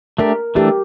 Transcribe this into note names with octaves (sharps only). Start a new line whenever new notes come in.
A3 D4 G4 A#4
E3 A3 D4 G4